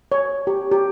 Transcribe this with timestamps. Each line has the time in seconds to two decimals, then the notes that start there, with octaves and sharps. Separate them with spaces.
0.12 C#5
0.47 G4
0.72 G4